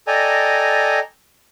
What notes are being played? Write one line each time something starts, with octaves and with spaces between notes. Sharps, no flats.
A4 D5 D#5 G5 G#5 A#5